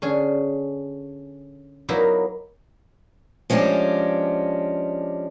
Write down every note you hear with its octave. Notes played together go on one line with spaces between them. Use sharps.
D3 C#4 G#4
F#3 A#3 B3 D#4 E4
F3 G#3 C#4 D4 G4